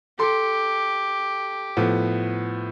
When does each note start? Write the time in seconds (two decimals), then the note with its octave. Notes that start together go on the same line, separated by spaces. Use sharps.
0.19 G4 A4 C6
1.77 A2 F3 B3